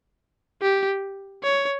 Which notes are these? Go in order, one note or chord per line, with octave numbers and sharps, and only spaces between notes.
G4
C#5